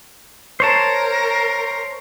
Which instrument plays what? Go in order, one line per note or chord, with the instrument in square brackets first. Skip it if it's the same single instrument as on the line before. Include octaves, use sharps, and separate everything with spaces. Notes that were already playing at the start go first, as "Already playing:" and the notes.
[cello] A#4 [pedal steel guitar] C5 C#5 A5